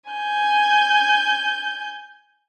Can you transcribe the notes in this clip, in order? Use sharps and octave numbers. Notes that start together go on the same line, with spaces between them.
G#5 G6